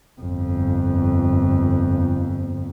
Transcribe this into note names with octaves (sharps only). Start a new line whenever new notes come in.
G1 F2